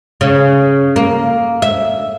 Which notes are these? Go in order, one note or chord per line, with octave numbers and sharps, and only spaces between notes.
C#3
A#3
E5